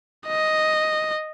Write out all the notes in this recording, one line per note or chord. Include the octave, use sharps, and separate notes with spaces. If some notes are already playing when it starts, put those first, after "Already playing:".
D#5